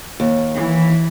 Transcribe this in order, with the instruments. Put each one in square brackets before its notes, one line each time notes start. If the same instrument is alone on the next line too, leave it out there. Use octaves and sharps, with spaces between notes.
[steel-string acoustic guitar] D#2
[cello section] E3